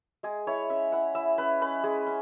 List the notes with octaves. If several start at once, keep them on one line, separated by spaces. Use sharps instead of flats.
G#3 G#4
E4 C#5
C#4 E5
E4 F#5
E4 E5
C#4 B4
C#4 B4
G#3 G#4
C#4